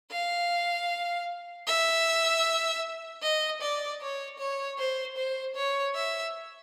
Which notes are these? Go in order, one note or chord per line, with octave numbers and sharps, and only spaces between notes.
F5
E5
D#5
D5
C#5
C#5
C5
C5
C#5
E5